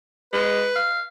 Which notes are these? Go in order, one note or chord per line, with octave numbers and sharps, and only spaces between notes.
G#3 B4
F5